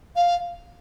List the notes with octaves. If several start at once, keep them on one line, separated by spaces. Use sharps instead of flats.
F5